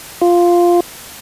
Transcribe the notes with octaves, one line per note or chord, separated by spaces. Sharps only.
F4